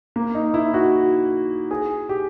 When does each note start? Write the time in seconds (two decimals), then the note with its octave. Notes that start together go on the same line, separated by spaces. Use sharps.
0.16 A#3
0.35 D#4
0.54 E4
0.74 F#4
1.71 G#4
2.09 G4